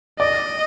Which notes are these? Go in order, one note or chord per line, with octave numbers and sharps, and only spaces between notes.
D5 D#5